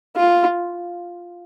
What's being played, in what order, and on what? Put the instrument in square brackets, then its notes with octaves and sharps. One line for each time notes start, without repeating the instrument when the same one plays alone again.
[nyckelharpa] F4